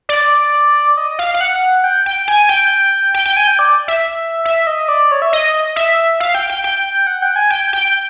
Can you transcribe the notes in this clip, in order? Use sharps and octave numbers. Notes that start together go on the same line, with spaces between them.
D5
D#5
F5
F5
F#5
G5
G5
G#5
G5
G5
G5
G#5
G5
D5
E5
E5
D#5
D5
C#5
E5
D#5
E5
F5
G5
G5
G5
F#5
G5
G#5
G5
G5